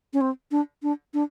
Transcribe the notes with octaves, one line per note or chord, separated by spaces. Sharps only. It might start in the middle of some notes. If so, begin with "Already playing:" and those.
C#4
C4
D4
D4
D4